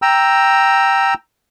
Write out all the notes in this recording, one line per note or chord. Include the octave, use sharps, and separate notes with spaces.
G5 A#5 E6